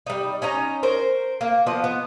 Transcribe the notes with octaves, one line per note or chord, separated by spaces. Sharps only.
G3 D#4
C#4 D#4 A#5
A#4 C5
A#3
F3 B3 D#5
B3